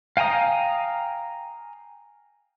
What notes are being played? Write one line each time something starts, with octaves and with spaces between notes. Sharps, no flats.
F5 G5 G#5 A#5 D#6